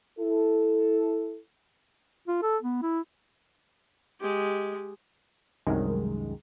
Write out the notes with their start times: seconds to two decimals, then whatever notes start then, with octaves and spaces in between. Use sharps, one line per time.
0.19 E4 A4
2.28 F4
2.42 A4
2.63 B3
2.82 E4
4.20 G#3 G4
5.67 C2 F#2 D#3 G#3